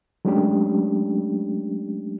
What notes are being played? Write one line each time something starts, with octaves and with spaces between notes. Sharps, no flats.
F#3 G#3 A3 C#4 D4 G4